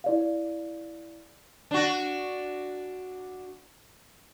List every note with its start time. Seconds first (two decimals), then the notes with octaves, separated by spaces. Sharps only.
0.04 E4 D5 F5
1.71 D4 F#4